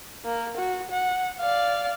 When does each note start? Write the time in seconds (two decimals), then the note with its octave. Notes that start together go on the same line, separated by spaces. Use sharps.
0.25 A#3
0.57 F#4
0.91 F#5
1.40 D5 F5